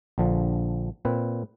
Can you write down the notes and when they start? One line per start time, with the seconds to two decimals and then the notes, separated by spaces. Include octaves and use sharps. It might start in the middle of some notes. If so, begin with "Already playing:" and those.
0.18 A#1 D3 F3
1.05 A#2 C4 B4